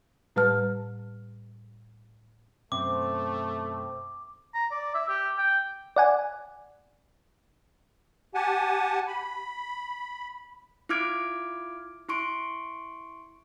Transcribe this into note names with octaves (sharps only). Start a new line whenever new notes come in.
A2 G3 B4 A5 F6
F#2 B2 A3 C4 E5 D6
A#5
D5
E5
G4
G5
D5 F#5 G#5
G4 F#5 G#5 A5
B5
E4 F4 D6 F6 G#6 D7
E4 C6 C#6 D7